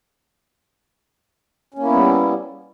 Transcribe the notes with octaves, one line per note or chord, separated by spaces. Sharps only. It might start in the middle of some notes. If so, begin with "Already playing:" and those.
G3 A#3 B3 C#4 E4